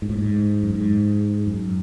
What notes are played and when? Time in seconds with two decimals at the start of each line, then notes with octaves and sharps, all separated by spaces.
0.02 G#2
0.10 A2
0.19 G#2
0.63 F#2
0.75 G#2
1.47 F#2